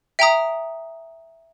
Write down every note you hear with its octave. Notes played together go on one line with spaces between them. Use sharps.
E5 G5 A#5 D#6